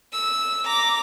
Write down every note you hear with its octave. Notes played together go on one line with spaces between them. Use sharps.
E6
A#5 D6